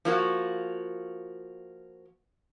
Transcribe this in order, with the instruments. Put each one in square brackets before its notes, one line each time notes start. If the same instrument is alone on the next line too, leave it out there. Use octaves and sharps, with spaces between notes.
[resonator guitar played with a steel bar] F3 A#3 F#4